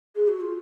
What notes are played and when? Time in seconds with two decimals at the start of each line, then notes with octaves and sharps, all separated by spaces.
0.15 G#4
0.27 F#4
0.40 F4